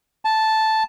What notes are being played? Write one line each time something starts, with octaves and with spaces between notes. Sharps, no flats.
A5